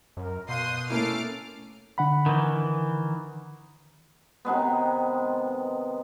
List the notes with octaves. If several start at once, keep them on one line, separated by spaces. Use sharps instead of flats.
F#2 A#4
B2 F5 C6 D#6 F#6 G6
A3 A#3 C#4 E4 A4 D6 F6 C7
D3 F#5 B5
D#3 E3
C3 D#3 G#3 B3